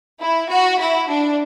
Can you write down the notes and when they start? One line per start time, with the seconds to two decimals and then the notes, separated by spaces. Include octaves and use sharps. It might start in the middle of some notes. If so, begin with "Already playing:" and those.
0.21 E4
0.50 F#4
0.80 E4
1.09 D4